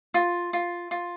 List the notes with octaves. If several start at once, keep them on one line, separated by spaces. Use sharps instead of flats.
F4
F4
F4